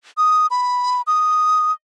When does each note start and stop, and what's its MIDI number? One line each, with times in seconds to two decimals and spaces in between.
0.17 0.47 87
0.51 1.02 83
1.07 1.72 87